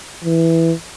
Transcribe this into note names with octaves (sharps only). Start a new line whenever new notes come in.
E3